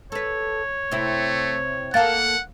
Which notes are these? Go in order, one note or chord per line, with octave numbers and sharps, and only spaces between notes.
A4 B4 C#5
C3 A3 C4 E4
A#3 A4 F5 F#5 A6